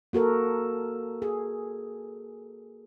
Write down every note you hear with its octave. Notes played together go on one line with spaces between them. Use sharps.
A#3 F#4 A4 A#4
G#4